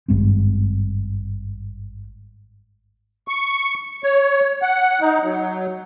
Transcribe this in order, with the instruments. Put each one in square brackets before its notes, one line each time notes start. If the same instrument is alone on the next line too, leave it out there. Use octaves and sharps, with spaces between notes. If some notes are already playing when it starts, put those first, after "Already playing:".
[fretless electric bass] G#1 G2 G#3 C4
[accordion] C#6
C#5
F#5
D#4
F#3